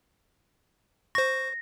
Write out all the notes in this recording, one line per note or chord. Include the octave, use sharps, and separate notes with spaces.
C5 C#6 A#6